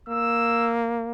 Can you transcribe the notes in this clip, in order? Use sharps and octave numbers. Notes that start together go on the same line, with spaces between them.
A#3 E6